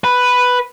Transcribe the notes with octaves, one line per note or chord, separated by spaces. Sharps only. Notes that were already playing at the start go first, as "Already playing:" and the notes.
B4